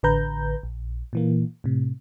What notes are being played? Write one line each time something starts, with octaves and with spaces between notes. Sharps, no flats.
A1 D3 B4 A#5 G6
A#1
A#2 E3 A#3
A2 C3